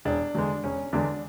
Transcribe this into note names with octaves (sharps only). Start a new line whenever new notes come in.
E1 D4
E2 D3 G#3
E1 C#4
E2 D3 G#3 D4